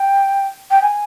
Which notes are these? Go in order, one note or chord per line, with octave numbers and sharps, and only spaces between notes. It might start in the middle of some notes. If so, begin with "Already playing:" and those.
Already playing: G5
G5
G#5